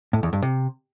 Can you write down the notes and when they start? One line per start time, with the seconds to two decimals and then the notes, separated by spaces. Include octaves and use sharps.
0.13 A2
0.23 E2
0.33 G2
0.42 C3